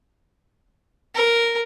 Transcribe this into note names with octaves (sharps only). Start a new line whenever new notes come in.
A#4